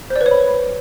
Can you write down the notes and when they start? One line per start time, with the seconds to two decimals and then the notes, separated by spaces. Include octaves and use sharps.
0.10 C5
0.16 D5
0.21 B4
0.26 C#5
0.31 B5